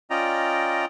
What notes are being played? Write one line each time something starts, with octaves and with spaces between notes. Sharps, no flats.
C#4 F4 D5 D#5 G5 A#5